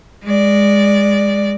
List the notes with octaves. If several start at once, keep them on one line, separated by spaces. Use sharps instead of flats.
G#3 D5